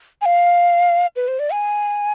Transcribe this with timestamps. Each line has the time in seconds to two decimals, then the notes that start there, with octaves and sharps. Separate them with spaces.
0.21 G#5
0.26 F5
1.16 B4
1.28 C5
1.39 D5
1.52 G#5